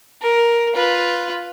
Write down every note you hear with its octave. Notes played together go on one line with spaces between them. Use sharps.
A#4
F4 B4